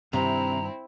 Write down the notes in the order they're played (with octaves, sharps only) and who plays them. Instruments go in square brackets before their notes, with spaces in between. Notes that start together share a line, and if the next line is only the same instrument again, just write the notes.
[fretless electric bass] G2 D#3 [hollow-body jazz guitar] C3 [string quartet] C4 E4 [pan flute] A#5